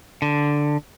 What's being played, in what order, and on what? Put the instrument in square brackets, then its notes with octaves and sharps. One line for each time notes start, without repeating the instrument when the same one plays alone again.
[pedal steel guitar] D3